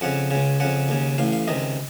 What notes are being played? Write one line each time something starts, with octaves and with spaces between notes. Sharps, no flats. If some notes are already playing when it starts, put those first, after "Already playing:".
F2 C#3 F#5
C#2 C#3
F2 C#3 F#5
D#2 C#3
A1 A2 F5
F5
C#2 C3 D#3 D#5